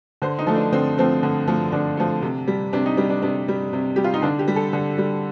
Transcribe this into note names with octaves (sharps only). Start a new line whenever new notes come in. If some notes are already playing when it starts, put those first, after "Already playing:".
D3 C5
D#4
F3 A3
D4
D3 C4
F3 A3 C4
D3
F3 A3
D3 D4
F3 A3
C3
G3
C3 D4
D#4
G3 D4
D4
C3 D4
G3
C3
G3 G4
F4
D#4
D3 D4
G4
G3
A4
D3
G3